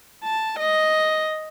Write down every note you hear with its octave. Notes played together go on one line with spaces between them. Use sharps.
A5
D#5